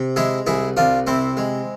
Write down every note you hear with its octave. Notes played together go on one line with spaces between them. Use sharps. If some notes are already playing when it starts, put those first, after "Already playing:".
Already playing: C3
G#3 E4 G#4
C2 E4 G#4
C2 D4 F4
C3 C4 E4
G#3